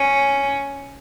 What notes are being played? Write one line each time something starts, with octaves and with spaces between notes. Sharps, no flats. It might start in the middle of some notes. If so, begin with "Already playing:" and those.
Already playing: C#4